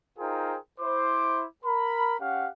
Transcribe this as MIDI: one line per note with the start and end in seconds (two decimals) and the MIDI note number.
0.18 0.56 63
0.18 0.56 65
0.18 0.56 68
0.18 0.56 70
0.18 0.56 72
0.18 0.56 79
0.80 1.44 64
0.80 1.44 72
0.80 1.44 86
1.64 2.15 70
1.64 2.15 83
2.19 2.48 61
2.19 2.48 67
2.19 2.48 77
2.19 2.48 78